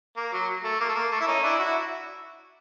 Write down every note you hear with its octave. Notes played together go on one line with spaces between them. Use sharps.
A#3
F#3
A3
A#3
A3
A#3
A3
E4
C#4 D#4
D4 E4
E4 F#4